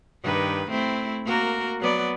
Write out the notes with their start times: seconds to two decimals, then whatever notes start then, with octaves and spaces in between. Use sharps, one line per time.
0.23 G2 D#3 B4
0.70 A3 C4 E4
1.24 A#3 F#4 A#4
1.79 F#3 B3 D5